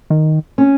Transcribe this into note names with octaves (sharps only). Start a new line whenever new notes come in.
D#3
C#4